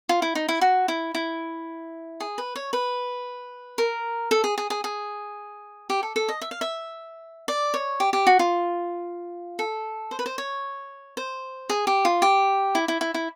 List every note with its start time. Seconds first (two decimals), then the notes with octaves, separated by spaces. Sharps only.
0.09 F4
0.22 E4
0.35 D#4
0.49 E4
0.61 F#4
0.88 E4
1.15 E4
2.20 G#4
2.38 B4
2.56 C#5
2.73 B4
3.78 A#4
4.31 A4
4.44 G#4
4.58 G#4
4.70 G#4
4.84 G#4
5.90 G4
6.03 A4
6.16 A4
6.28 D#5
6.42 E5
6.51 F5
6.61 E5
7.48 D5
7.74 C#5
8.00 G4
8.13 G4
8.27 F#4
8.39 F4
9.59 A4
10.11 C5
10.19 B4
10.26 C5
10.38 C#5
11.17 C5
11.70 G#4
11.87 G4
12.05 F4
12.22 G4
12.75 E4
12.88 E4
13.01 E4
13.14 E4